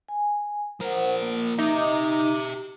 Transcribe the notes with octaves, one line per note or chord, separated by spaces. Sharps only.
G#5
F3 A#4 C5 F#5
A#3
D#4 G4 E5 D6